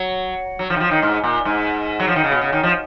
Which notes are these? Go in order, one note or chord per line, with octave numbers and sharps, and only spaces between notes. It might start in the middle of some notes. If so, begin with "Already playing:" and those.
Already playing: F#3
F#3
F3
D#3
F3
D#3
G#2
A#2
G#2
F#3
F3
D#3
C#3
B2
C#3
D#3
F3